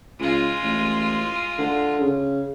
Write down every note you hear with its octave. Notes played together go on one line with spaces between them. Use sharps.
C#2 G#3 F4
A1
D3
C#3